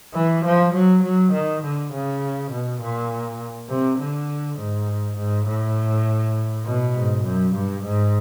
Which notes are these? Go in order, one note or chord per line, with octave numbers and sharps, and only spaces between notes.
E3
F3
F#3
F#3
D#3
D3
C#3
B2
A#2
C3
D3
G#2
G#2
A2
B2
G#2
F#2
G2
G#2